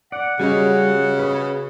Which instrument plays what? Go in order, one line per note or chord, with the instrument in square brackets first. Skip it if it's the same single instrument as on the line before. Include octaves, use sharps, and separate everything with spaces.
[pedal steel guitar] D5 [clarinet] F#5
[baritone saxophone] C#3 [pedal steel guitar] G3 C#4 C#5 [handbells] F#4 D#5
[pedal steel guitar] B4 D#6